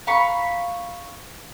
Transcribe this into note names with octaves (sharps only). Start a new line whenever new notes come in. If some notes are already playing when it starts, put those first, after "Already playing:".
F5 A#5 B5 C#6